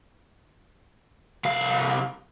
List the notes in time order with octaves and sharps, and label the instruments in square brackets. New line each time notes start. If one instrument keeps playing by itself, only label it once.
[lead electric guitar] C2 F5